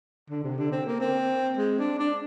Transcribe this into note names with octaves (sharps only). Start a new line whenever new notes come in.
D3
C3
D3
C4
A#3
C4
G#3
D4
D4